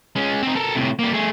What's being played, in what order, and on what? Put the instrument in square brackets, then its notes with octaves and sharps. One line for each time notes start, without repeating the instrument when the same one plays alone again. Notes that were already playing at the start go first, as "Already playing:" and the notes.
[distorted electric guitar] G#3 C#4
C4 D#4
A4 A#4
A2 C3
G3 A#3
A3 G#4